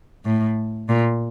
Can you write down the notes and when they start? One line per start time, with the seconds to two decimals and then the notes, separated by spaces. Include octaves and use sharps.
0.25 A2
0.89 A#2